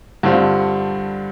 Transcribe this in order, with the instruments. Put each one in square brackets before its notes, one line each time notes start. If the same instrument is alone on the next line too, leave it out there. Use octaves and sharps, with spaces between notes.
[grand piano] G2 D3 G3 C4 F4